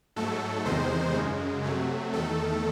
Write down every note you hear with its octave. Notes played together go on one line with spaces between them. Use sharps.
G#2 F#3 A3 A4
E2 C3 D#3 G#3 C5
F#2 C#3 G#3
C3 F#3 A3
E2 D#3 A3 A4